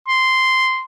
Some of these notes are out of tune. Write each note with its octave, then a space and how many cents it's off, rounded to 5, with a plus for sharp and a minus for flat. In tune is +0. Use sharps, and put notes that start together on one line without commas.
C6 -5